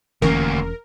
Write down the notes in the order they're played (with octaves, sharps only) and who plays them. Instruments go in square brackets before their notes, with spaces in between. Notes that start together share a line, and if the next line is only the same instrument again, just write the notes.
[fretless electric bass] E1 E3 C#4 [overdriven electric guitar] D2 A#3 [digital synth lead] A#4